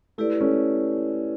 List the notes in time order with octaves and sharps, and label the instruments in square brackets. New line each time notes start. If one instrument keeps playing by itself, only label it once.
[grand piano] A3 [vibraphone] E4 G4 B4 D5
[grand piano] A3 C#4